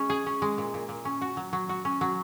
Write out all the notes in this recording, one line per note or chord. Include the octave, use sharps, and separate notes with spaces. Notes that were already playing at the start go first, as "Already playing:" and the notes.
Already playing: G#3 C#4
G#4
C#4
G#3
A#2
A#2
A#2
C#4
F#4
F#3
F#3
F#4
C#4
F#3